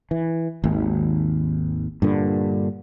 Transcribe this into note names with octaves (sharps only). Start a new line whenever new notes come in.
E3
G#1 D#2
G2 A#2 D3